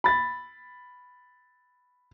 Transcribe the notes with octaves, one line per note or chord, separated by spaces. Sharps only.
B5 A6